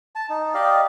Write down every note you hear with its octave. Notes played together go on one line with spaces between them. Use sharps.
A5
D#4
G4 D5 D#5 F5